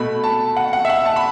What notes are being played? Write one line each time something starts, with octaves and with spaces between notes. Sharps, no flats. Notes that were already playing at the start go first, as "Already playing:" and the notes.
Already playing: B2 A3 B5
A5
F#5
F#5
E5
F#5
A5
B5